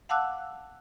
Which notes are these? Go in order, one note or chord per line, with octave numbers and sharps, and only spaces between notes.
F5 F#5 A5 D6 E6 F#6